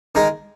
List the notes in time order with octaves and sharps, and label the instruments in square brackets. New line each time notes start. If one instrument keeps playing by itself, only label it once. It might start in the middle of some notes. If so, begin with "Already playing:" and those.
[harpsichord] D#3 G#3 D#4